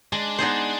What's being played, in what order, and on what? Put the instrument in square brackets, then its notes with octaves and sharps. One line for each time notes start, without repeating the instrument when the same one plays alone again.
[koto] G#3 [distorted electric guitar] D4
[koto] B3 D#4 G#4 C5